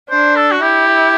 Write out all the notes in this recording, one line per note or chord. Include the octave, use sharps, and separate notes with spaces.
D4 C5
A4
F#4
E4 G4